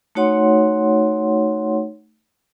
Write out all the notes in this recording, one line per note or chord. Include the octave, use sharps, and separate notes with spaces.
A3 D#4 F#4 C#5 F#5 C6